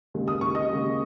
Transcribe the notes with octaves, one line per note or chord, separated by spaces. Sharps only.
D#2 C#3 G#3
D#6
C#6
D#5 D#6
D#2 C#3 G#3